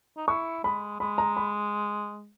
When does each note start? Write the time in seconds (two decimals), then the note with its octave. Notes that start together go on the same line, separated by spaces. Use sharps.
0.17 D#4
0.28 E4 C#6
0.64 G#3 B5
1.00 G#3 B5
1.18 A#5
1.37 B5